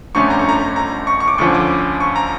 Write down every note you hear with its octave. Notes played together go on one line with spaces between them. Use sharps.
G1 F2 D3 A3 C#4 C#6
A#5
C#6
A#5
A#5
C#6
C#6
D6
D2 D3 F3 C#4 C#6
D6
C#6
A#5